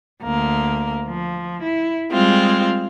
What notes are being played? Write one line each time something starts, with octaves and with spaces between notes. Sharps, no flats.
D2 A#3
F3
E4
G3 G#3 C4 F4